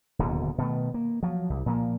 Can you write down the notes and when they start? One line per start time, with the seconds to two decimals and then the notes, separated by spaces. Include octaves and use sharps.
0.19 D1 D#2 B2 D3
0.58 B2 D#3 A3
0.94 A#3
1.23 F3 F#3
1.50 C2
1.66 A#2 F3 A#3